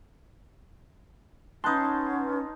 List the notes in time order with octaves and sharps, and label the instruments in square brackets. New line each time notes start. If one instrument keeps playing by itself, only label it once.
[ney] C#4 [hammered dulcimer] D#4 A5 [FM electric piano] B4 F#5 C6